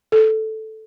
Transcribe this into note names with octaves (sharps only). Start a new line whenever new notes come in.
A4